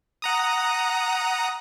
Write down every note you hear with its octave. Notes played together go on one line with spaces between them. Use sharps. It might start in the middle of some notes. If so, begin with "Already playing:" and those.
F#5 A#5 D#6